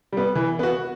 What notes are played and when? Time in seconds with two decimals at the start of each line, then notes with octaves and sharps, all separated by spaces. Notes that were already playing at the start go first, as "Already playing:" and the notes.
0.13 G3 B3
0.35 E3
0.59 B3 F#4